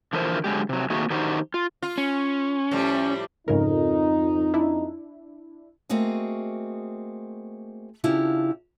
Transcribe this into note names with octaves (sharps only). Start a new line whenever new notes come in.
D3 E3 F3 E4 A#4 C5
D3 F#3 G#3 G4
C3 F#3
D#3 A3 A#3 C4 F#4 G#4
D#3 D4 D#4 F#4 G4 C5
F4
F4
C#4
A2 F3 G3
F2 G#2 C#3 D#4 A#4
D4 E4
A3 A#3 C4 F#4 G#4 D#5
C#3 F3 D4 E4 G4 F5